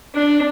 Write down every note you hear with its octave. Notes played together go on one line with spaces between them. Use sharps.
D4